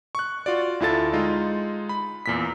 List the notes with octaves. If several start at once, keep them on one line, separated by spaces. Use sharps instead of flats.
C#6 F#6
F4 F#4 D5
D2 E4 F4 A4 A6
G#3 D#4 F4
B5
E2 A#2 B6